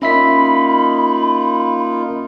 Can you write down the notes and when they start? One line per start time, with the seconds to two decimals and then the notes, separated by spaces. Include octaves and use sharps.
0.02 A#3 C#4 D#4 F4 E5 B5 B6